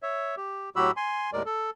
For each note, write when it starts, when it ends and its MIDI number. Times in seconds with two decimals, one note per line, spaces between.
0.03 0.35 73
0.03 0.35 76
0.37 0.70 67
0.76 0.91 45
0.76 0.91 54
0.76 0.91 66
0.76 0.91 67
0.76 0.91 83
0.76 0.91 88
0.97 1.30 80
0.97 1.30 84
1.33 1.43 39
1.33 1.43 45
1.33 1.43 56
1.33 1.43 70
1.33 1.43 74
1.46 1.70 69